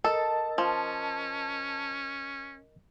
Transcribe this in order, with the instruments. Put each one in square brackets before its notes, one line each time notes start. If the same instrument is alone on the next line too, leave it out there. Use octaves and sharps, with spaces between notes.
[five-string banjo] A4 [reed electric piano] A#4 D#5 E6 [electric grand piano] A5
[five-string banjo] F3 [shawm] C#4